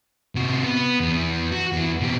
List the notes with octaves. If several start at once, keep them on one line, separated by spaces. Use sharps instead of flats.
C3 F#4
B3
E2
F#4
E2 E3
B2 G4